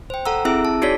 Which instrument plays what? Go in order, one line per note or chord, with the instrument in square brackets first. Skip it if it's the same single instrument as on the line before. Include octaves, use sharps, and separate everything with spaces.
[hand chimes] C5 G5
A4 F#5 A#5 E6
C4 E4 G#4 E5 E6 D7
A5
D#4 F#4 G#4 C#5 D5 B6